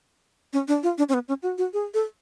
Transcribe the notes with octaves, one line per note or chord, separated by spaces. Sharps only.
C#4
D4
F4
D4
C#4
B3
C#4
F#4
F#4
G#4
A4